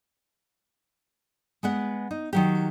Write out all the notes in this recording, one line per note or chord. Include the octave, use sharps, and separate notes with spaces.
G#3 B3 F#5
D#4
D#3 F#3 G4